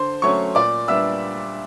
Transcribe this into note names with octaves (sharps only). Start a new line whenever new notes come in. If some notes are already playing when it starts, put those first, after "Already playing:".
Already playing: D3 C5 C6
F#3 A3 C#4 C#5 C#6
A#2 D5 D6
G3 B3 D4 E5 E6